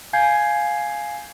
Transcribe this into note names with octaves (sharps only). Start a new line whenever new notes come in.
F5 G#5 G6 G#6 C7